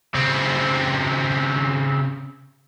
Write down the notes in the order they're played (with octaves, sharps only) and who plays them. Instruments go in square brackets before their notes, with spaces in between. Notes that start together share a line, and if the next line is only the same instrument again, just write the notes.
[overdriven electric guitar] C#3 C4